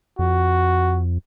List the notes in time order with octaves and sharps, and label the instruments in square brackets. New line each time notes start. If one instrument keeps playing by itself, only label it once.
[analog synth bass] F2 [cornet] F#4